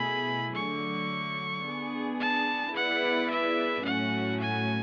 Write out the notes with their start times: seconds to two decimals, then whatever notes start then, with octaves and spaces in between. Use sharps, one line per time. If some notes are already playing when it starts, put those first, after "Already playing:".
Already playing: B2 A3 E4 G#4 B5
0.55 D3 F#3 A3 C#6
1.66 B3 D4 G#4
2.20 A5
2.75 B3 E4 G#4 B4 D5 F#5
3.30 E5
3.85 A2 F#3 A3 C#4 F#4 F#5
4.40 G#5